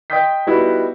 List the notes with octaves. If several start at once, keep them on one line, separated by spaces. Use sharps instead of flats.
D#5 G5 C6 D#6 G6 B6
G3 B3 D#4 E4 F#4